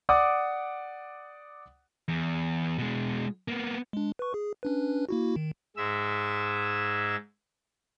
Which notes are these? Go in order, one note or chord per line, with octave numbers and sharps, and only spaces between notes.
D5 F#5 D6 D#6
E2
B2 G#3
A#3 B3
G#3 D4
B4 C#6
G#4
C#4 D4 B4
A#3 E4 F#4
D#3
G#2 G#3 E5 E6